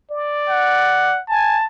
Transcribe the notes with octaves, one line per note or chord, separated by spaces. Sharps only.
D5
F#5
G#5 A5